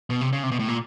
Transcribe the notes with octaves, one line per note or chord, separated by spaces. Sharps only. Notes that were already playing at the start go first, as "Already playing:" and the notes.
B2
C3
C#3
C3
B2
A2
A#2